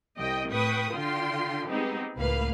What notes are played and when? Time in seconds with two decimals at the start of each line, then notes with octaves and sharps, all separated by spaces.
0.17 C2 D#5 G5
0.51 A2 B4 G5 C#6 D#6
0.93 D3 F4 G5 C6
1.69 G#3 B3 C4 D#4 G4
2.17 C#2 A2 A#3 B4 F5